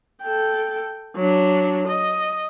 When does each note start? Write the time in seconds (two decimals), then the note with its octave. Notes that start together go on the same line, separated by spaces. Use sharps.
0.22 A4 G5
1.17 F#3 D4
1.88 D#5